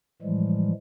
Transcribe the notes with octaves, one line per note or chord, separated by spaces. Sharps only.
A2 E3 F3 G3 G#3